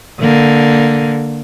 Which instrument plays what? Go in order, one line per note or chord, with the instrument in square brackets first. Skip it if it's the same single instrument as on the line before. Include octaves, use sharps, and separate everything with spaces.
[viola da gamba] D3 A#3